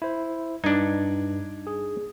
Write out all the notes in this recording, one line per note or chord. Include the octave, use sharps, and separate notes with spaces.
E4 C5
G2 D4 D#4 G#6
G#4